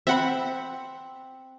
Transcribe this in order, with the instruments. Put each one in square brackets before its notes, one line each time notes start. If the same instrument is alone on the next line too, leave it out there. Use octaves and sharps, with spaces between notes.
[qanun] C4 [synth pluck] E5 F#5 B5